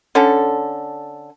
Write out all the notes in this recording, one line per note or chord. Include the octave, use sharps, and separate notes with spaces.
D3 C#4 A4